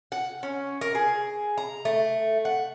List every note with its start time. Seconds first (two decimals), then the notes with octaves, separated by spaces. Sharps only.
0.12 F#5
0.43 C#4
0.81 A#4
0.95 G#4
1.58 A#5
1.85 A3
2.45 F#5